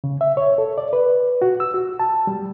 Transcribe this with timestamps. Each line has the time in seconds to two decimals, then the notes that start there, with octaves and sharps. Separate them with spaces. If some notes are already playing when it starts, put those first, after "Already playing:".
0.04 C#3
0.21 E5
0.37 C#5
0.58 A4
0.78 D5
0.93 B4
1.42 F#4
1.60 E6
1.74 F#4
2.00 A5
2.27 G3